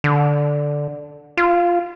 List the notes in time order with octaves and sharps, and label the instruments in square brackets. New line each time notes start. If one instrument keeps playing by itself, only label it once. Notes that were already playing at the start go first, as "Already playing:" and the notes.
[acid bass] D3
F4